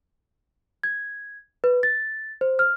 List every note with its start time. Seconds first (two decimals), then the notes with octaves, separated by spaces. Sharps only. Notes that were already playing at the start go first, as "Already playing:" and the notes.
0.84 G#6
1.64 B4
1.83 A6
2.41 C5
2.59 F6